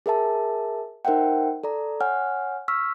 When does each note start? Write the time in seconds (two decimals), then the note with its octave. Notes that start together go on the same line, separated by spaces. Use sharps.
0.06 G#4 A#4 E5 A5
1.05 D#4 A#4 C5 E5 F#5 G5
1.64 A4 D5 A#5
2.00 C#5 F#5 G#5 F6
2.68 C#6 E6 F6 B6